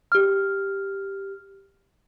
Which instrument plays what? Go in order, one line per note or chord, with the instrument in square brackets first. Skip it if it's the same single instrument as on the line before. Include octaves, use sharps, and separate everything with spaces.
[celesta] G4 F6